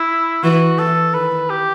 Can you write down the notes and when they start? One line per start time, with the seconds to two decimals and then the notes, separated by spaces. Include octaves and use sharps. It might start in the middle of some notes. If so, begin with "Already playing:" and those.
Already playing: E4
0.43 E3 F#4
0.78 E3 A4
1.14 D#3 B4
1.50 G4